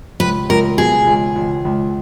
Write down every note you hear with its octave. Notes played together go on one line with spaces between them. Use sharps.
C#2 B4
C#2 A#4
B2 G#4
C#2
C#2
C#2